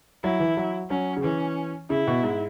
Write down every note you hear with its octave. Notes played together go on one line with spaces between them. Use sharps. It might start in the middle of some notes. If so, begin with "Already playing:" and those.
F#3 E4
E3
F#3
F#3 C#4
C#3
E3 C#4
C#3 E4
B2
G#2